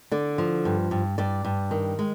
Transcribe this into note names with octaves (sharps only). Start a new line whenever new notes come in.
D3 D5
F3
G2
G2
G2 D5
G2
D#3
G#3